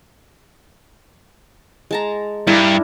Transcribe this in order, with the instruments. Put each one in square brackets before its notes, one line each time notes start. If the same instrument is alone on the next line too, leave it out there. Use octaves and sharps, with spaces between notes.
[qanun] G#3 A5 A#5
[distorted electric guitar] G2 [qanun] D4 E4 A#4